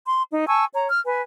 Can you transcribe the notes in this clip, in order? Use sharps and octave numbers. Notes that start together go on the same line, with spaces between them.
C6
D#4
G#5 A5 C#6 E6
C#5 A#5
F6
B4 G#5